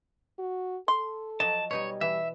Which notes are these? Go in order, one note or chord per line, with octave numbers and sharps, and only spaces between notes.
F#4
A4 C6
F3 F#3 D#5 A5
B2 G3 D#4 C#5 G#5
E3 E5